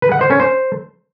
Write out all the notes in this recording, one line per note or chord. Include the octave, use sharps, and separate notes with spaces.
B4
F#5
C5
C#4
C5